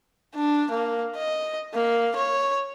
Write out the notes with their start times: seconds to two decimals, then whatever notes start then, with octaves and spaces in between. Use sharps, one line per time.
0.35 D4
0.71 A#3
1.16 D#5
1.74 A#3
2.16 C#5